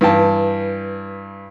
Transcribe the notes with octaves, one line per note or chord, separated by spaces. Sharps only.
G2 E3 G5 A5